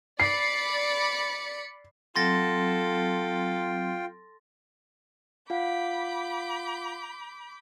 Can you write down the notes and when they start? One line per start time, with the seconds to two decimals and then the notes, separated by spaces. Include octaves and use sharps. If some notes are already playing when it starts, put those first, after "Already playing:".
0.20 D5 B5 C7 C#7
2.16 F#3 C4 F4 A4 G5 C6 A6 A#6
5.50 F4 F5 F#5 B5 D6 G6